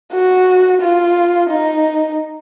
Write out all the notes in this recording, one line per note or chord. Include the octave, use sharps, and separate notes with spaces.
F#4
F4
D#4